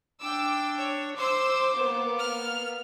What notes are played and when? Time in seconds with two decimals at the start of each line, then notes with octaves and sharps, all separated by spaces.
0.23 D4 G5 D6 E6
0.78 C#5
1.17 C5 C6 D6 E6
1.78 A#3 B3
2.19 F6